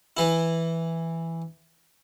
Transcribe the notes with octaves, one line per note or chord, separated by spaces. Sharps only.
E3 E4